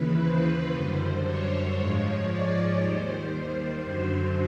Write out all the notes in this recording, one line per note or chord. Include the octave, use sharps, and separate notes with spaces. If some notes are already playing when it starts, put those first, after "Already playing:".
Already playing: D#2 C#3 E3 B4
C5
F#2 D3 G3
C#5
G#2 F3 G#3 C#5
D5
D#2 D#3 G3 C5
F#2 D3 F#3 C5